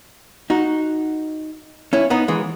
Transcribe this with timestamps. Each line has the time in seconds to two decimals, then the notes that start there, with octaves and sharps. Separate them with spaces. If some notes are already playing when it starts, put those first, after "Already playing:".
0.50 D#4 F#4
1.93 C#4 E4
2.10 B3 D#4
2.28 E3 G#3